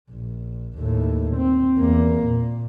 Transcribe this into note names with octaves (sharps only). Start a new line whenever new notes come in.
A#1
D#2 A2
C4
E2 A#3
A#2